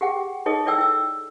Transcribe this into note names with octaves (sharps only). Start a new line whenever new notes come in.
G4 G#4 F#5 G5
D#4 G#4 A4 C#5 D#5
E4 A4 C#5 D5 G5 E6
E4 E6